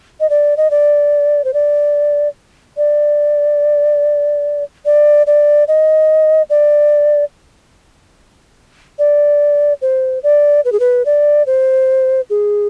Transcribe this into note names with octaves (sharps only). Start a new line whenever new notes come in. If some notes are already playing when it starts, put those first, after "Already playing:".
D#5
D5
D#5
D5
C5
D5
D5
D5
D5
D#5
D5
D5
C5
D5
B4
G#4
B4
D5
C5
G#4